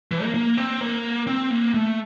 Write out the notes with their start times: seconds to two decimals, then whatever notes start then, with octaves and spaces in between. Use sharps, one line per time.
0.11 E3
0.23 A#3
0.34 A#3
0.57 C4
0.81 A#3
1.27 C4
1.50 A#3
1.74 A3